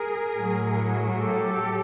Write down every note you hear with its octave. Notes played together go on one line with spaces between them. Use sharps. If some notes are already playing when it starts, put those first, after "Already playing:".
Already playing: G#4 A#4
A2 F#3
G4 A4